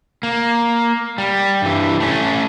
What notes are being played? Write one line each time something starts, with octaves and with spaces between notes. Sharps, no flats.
A#3
G3
G2 E3
A3 C#4